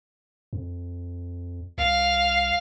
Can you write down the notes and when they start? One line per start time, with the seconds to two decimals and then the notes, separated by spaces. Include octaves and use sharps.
0.53 F2
1.78 C2 F5